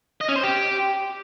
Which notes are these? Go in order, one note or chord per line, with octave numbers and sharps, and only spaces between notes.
D#5
C#4
C5
G4